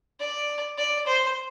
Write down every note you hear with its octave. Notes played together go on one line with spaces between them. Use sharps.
D5
D5
C5